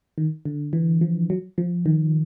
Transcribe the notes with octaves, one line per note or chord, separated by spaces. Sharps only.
D#3
D3
E3
F3
F#3
F3
D#3